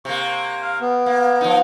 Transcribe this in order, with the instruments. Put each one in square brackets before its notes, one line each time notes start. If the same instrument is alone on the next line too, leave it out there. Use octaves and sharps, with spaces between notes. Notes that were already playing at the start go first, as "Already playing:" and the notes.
[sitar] C3 A#3 [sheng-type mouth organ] C#6
[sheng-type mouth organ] F5
B3
[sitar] A#3
F3 D#4